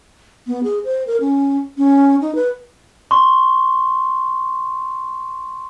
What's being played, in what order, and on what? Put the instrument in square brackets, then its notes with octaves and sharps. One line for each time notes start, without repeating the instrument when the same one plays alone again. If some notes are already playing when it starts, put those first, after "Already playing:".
[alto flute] B3
G#4
C5
A#4
C#4
C#4
D#4
B4
[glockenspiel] C6 C#6